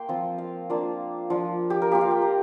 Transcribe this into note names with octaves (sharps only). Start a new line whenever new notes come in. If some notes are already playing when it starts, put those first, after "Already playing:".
Already playing: A#3 G5 C6
F3 C4 F4
F5
A#3 D4 F4
F3 D4 F4
G4
A#4
A#3 F4 G4
F5
G5
A#5